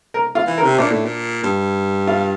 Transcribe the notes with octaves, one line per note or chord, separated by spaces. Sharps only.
A#4
F4
E3
A#4
C3
A#2 D4
A2
A#2
G2
F4